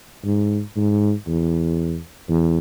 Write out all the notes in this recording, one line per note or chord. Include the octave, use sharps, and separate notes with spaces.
G#2
G#2
E2
E2